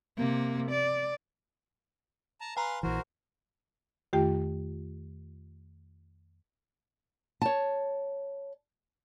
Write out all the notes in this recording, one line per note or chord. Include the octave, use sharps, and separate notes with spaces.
C3 A#3
D5
A5 A#5
B4 F5 G#5 A#5 C6
A#1 E3 F#4 A#4 C5
F2 D#3 A3 F4 G4 G5
C#5 A5